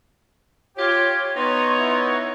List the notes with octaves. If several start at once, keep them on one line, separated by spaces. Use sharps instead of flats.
F4 G4 C#5
B3 D#4 C#5 C6
E4